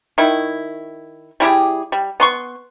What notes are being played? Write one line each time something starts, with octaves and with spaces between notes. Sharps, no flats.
D#3 E4
G3 E4 G4 G#4
G3
B3 C6 C#6